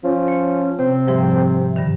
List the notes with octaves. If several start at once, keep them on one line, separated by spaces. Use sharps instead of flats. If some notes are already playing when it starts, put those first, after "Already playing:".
F3 C#4
C5 C#5
C3 C4
G#2 C3 F3 G3
G2 D3 D#3